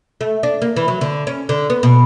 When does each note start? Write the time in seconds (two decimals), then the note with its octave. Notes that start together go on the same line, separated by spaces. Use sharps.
0.21 A3
0.43 D4
0.62 A#3
0.76 E3
0.88 F#3
1.01 D3
1.27 C#4
1.49 D3
1.70 B3
1.83 B2